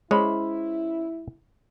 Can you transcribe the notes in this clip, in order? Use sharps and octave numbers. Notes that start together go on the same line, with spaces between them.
G#3 C#4 E4 C5 C#5 B5